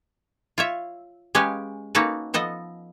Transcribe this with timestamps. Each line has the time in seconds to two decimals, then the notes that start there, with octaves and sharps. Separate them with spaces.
0.58 F4 C#5 E5
1.35 G#3 C#4 G4 B4 F5 G#5
1.95 A#3 C#4 D#4 F#4 A4 B4
2.34 F3 B3 A4 D#5